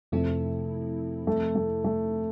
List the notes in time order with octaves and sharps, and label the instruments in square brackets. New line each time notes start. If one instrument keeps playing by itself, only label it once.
[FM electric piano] F2 C3 F3 C4 E4 [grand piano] A3
[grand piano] A3
A3
A3